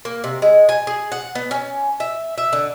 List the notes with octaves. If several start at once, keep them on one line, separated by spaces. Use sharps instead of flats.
A#3
C3
G#3
G#5
G#4
F#5
B3
C#4
E5
E5
D3